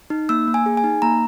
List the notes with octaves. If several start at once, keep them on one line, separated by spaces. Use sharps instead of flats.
D#4
A#3 E6
A#3
G#5
G#4
G#5
D#4
A#3 A#5